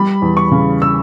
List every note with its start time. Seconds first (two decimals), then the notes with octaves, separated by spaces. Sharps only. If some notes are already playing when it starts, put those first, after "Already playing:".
Already playing: G3 B5
0.22 E2
0.37 C#6
0.51 C#3
0.82 E6